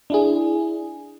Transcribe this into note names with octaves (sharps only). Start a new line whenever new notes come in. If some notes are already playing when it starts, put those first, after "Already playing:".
D4 E4 G#4